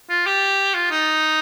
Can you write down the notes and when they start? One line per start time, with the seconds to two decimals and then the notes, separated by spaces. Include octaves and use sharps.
0.09 F4
0.26 G4
0.74 F4
0.90 D#4